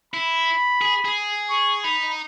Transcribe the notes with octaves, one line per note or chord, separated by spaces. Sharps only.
E4 B5
G#4
G#4
C#6
D#4 B5